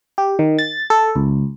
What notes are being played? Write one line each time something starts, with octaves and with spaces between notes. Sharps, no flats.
G4
D#3
A6
A4
C#2